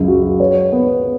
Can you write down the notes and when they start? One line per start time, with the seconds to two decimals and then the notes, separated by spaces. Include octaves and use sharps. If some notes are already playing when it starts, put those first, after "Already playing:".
Already playing: C#2 F#2
0.08 F#4
0.40 C#5
0.72 B3